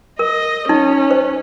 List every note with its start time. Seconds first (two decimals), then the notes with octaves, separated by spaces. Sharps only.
0.19 A#4 D#5
0.69 C#4 D#4
1.11 C5